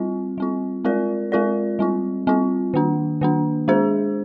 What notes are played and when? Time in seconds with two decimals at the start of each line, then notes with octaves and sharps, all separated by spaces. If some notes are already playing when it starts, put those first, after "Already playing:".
Already playing: G3 C4 F4
0.38 G3 C4 F4
0.84 G#3 C4 F4 A#4 D5
1.32 G#3 C4 F4 A#4 D5
1.79 G3 C4 F4
2.27 G3 C4 F4
2.74 D#3 A#3 D4
3.21 D#3 A#3 D4
3.68 G#3 D4 G#4 C5